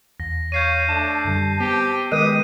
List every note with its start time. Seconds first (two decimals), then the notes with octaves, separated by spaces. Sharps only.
0.20 E2 A#6
0.52 C#5 F5 G6 C7 D#7
0.89 A3 D4 A5
1.25 F#2 D3 G3
1.60 B3 C4 G4 B6
2.12 D#3 G#3 G4 B4 D#6 D#7